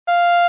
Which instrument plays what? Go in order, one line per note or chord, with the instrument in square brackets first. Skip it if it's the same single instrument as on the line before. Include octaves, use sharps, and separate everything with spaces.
[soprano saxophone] F5